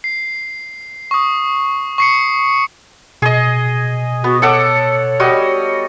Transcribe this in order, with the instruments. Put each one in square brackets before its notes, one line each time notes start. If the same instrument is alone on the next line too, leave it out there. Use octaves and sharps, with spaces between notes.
[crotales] C7
C#6 D#6
C#6 C7 C#7
[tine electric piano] B2 [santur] G#4 D#5
[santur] B3 [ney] F#4
[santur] A4 F#5 D6 [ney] C#5
[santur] G3 F#4 D#5